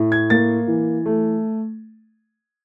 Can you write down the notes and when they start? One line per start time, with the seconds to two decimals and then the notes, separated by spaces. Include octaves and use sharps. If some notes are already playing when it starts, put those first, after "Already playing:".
Already playing: A2
0.12 G#6
0.30 A#3 A6
0.68 E3
1.06 A3